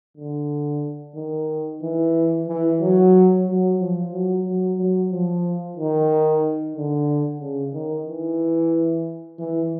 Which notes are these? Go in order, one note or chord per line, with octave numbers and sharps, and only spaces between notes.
D3
D#3
E3
E3
F#3
F#3
F3
F#3
F#3
F#3
F3
D#3
D3
C#3
D#3
E3
E3